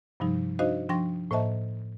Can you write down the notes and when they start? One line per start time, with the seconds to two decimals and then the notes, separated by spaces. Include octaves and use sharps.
0.20 G2 C3 F3 G3 D#4
0.59 D4 D#4 F#4 C5 D#5 F5
0.89 F3 D4 G5 C6 C#6 A#6
1.31 A2 A#3 C5 D#5 E5 A5